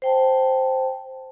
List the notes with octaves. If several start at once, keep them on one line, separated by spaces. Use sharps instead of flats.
C5 G5 A5